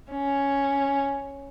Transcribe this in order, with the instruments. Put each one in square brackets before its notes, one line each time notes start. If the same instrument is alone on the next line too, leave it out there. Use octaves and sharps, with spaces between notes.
[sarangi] C#4